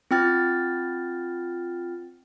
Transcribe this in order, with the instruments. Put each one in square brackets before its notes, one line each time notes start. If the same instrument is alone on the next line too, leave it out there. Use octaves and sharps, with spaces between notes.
[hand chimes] C4 F4 G5 F6 A6